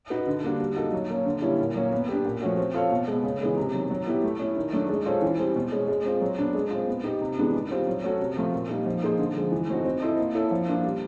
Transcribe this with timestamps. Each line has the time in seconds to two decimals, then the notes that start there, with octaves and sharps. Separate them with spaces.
0.10 D#4 F#4 B4
0.27 D3
0.43 G3 A#3 D4 F#4
0.60 G3
0.76 A#3 D#4 F#4 A4
0.93 F#3
1.10 A#3 C#4
1.25 D3
1.42 G3 A#3 C#4 E4
1.59 A#2
1.75 F#3 A#3 C#4
1.92 B3
2.09 D4 G4
2.25 A#2
2.41 F3 A3 C#4 F#4
2.58 C4
2.74 F4 A4 C#5 F5
2.91 B2
3.07 G#3 B3
3.24 C#3
3.41 E3 G#3 B3
3.57 C3
3.74 D#3 F#3
3.90 F#3
4.07 B3 E4 G4
4.23 A3
4.39 C#4 E4
4.56 D#3
4.73 F#3 A3 D4
4.89 G#3
5.06 C#4 F4 A4 C5
5.22 E3
5.39 G3 C4
5.55 B2
5.72 G#3 C#4
5.88 G#3
6.06 C4 F4
6.21 F#3
6.39 B3 D4
6.54 G#3
6.71 C4 F4
6.87 B3
7.04 D#4 G4
7.21 C3
7.37 E3 G#3 B3 D4
7.54 D#3
7.70 G3 C4 F4
7.87 F#3
8.03 A3 C#4 F#4 A4
8.20 C3
8.37 F3 A3 C4 F4
8.52 A#2
8.70 G3 A#3 D#4
8.86 F3
9.02 A#3 D#4 G#4 C5
9.19 D3
9.35 F3 G#3
9.52 E3
9.69 A3 C4 D#4 F#4
9.85 C4
10.02 E4 A4 C5 D#5
10.18 A#3
10.35 C#4 E4 A4
10.51 F3
10.68 A#3 D4 F4
10.84 G3